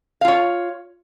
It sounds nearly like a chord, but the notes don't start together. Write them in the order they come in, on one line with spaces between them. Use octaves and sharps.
F5 F4 C#5